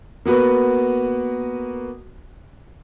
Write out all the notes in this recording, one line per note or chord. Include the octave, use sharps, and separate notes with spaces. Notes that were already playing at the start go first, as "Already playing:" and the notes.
A#3 B3 F#4 B4